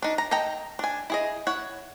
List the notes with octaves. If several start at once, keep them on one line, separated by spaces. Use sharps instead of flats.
D4 D#4
A#5
A4 D#5 G5 A#5
D4 G#5
E4 G#4 D#5
E4 C#5 F#5